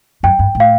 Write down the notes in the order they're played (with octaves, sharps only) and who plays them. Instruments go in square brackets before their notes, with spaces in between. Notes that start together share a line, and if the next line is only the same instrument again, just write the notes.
[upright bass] F#2 [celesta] G5
[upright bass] G2
A2
[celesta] F5